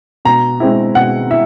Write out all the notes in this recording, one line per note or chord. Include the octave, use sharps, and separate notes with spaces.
B2 A#5
G#3 C4 E4
B2 F#5
E4 E5